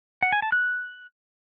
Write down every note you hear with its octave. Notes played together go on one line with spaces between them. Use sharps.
F#5
G#5
A5
F#6